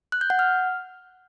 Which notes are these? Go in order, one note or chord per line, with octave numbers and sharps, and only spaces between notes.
F#6
G6
F#5
F6